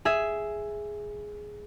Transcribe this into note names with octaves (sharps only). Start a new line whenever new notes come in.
G#4 E5